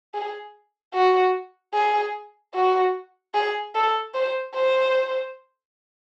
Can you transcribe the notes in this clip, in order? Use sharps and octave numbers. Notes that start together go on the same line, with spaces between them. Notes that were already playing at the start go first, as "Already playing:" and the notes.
G#4
F#4
G#4
F#4
G#4
A4
C5
C5